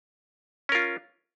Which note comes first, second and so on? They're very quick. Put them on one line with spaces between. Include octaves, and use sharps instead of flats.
C#4 A#4 F4